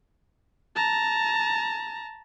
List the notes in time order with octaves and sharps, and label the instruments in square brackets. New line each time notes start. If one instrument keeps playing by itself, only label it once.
[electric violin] A5 A#5